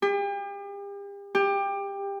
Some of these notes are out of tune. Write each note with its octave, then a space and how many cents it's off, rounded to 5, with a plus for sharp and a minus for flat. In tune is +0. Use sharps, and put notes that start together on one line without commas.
G4 +40
G4 +20